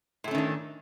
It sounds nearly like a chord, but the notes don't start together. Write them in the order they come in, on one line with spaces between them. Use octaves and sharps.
A2 A3 C#4 D#3 D4